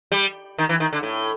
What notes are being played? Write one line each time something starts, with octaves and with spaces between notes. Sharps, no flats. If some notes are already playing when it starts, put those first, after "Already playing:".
G3
D#3
E3
D#3
D3
A2